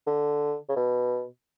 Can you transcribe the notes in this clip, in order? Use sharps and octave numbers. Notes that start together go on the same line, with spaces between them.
D3
C#3
B2